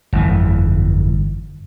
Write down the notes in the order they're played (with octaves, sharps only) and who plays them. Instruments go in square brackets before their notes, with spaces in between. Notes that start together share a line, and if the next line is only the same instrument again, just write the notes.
[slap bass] G1 F2 E3